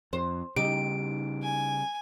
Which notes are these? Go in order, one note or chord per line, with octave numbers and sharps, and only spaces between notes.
F2 C5
C#3 G3 D#4 G4 D7
G#5